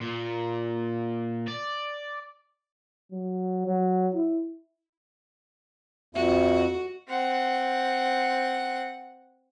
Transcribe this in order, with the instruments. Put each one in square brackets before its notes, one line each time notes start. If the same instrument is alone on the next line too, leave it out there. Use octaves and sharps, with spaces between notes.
[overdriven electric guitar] A#2
D5
[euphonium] F#3
F#3
E4
[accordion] F2 [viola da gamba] F#4 [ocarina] E5
[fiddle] C4 F#5